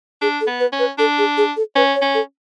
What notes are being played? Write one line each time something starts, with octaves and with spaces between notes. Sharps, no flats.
D4 G#4
A4
B3
B4
C#4
B4
D4 A4
G#4
G#4
A4
C#4 B4
C#5
C#4
A4